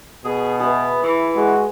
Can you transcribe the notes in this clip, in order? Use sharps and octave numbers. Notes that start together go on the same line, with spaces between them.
B2 G#4
B3 G#4 B4 E5
E3
G#3 F#4